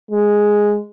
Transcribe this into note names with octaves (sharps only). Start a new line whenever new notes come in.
G#3